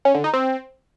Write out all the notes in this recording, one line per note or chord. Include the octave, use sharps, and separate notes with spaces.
C#4
D3
D#4
C4